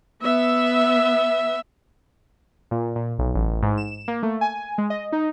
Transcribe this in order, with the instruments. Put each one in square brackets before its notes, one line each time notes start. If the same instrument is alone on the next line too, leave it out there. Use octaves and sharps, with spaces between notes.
[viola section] B3 E5
[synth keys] A#2
A#2
B1
A1
G#2
E7
A#3
A3
G#5
G#3
D#5
D#4